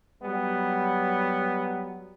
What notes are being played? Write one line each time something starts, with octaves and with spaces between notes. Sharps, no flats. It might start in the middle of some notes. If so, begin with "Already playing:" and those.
F#3 G3 B3